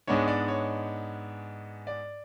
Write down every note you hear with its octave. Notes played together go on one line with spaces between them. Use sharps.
G#2 G#3 B3 D4 C#5
D5
C#5
D5